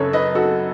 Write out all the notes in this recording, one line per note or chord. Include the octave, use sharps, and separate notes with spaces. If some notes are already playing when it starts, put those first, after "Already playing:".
Already playing: F#2 C#3 A4 B4 C#5
B4 D#5
F#4 A4